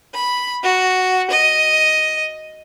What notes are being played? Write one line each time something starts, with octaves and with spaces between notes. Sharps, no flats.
B5
F#4
D#5